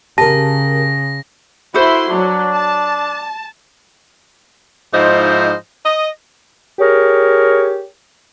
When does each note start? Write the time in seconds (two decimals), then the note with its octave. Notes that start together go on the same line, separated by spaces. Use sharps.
0.18 C#3 G4 A#4 A5 A#6
1.74 E4 F#4 A4 B4 C5 C6
2.10 F#3 D4
2.54 A5
4.93 G#2 F3 D#4 E4 C5 D#5
5.85 D#5
6.79 G4 G#4 A#4 C#5